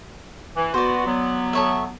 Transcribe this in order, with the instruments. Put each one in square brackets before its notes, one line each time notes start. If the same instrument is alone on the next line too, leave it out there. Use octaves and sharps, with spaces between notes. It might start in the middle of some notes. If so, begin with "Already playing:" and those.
[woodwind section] E3
[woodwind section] B3 F#4 [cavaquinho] C5 D5
[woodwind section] F#3 B3
[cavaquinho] A4 C#5 E5